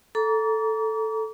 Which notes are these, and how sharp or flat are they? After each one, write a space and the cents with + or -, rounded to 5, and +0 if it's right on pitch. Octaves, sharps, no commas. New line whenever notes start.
A4 +0 A#5 +15 D6 -40